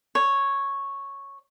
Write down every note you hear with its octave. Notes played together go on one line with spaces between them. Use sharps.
C#5